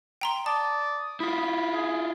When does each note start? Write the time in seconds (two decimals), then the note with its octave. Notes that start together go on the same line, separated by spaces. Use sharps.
0.21 G5 A#5 C6
0.46 D5 A5 D#6
1.20 E4 F4 B5
1.73 G#4